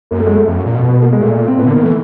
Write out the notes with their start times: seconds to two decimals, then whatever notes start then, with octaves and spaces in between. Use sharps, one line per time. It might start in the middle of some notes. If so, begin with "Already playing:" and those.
0.11 F#2 A#3
0.20 A3
0.27 G#3
0.35 A3
0.48 F2
0.57 F#2
0.66 A#2
0.75 B2
0.84 B3
1.02 A#3
1.13 G#3
1.20 A#2 A3
1.48 C4
1.57 A2 B3
1.66 D3
1.71 A#3
1.76 D#3
1.83 E3 A3